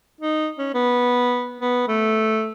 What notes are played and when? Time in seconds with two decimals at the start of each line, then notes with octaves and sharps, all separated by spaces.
0.21 D#4
0.58 C#4
0.74 B3
1.61 B3
1.88 A3